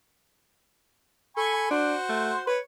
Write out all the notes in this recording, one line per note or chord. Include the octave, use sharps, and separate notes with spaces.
A4 G#5 B5 C#6
D4 F#4 C5
A3
B4 C#5